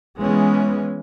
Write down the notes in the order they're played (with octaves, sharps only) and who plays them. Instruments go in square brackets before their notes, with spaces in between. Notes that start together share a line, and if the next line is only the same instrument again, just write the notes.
[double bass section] E3 G#3 B3 C#4